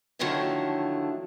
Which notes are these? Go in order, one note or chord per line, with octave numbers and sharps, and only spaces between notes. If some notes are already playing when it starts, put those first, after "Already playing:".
D3 D#3 F3 F#3 A3 E4